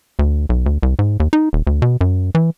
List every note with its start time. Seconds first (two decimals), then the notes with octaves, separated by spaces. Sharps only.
0.19 D2
0.49 B1
0.66 D2
0.83 C2
0.99 G#2
1.20 D#2
1.33 D#4
1.53 D#1
1.67 D2
1.82 B2
2.01 F#2
2.35 E3